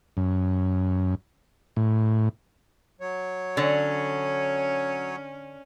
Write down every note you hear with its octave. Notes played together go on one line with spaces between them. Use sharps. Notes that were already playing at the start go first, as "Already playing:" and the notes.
F#2
A2
F#3 C#5
D3 C#4